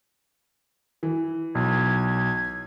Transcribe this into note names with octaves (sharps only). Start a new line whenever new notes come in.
E3
B1 G#6